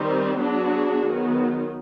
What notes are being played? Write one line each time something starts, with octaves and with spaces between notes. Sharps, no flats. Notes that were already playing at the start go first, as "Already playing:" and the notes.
Already playing: D#3 G3 C4
F#3 B3 D4 F#4 G#4
D#3 F#3 B3